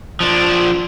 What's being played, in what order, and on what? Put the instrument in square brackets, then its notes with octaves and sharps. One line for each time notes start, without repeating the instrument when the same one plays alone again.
[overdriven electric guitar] F3 D4